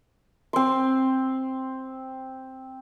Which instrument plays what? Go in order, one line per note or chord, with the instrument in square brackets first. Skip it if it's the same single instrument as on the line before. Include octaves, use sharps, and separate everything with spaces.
[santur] C4 C6